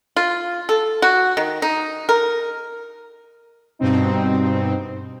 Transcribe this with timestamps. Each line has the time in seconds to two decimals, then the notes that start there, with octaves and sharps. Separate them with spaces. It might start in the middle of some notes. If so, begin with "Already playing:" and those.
0.16 F4
0.69 A4
1.02 F#4
1.37 D#3
1.62 D#4
2.09 A#4
3.79 G2 B2 C4 D#4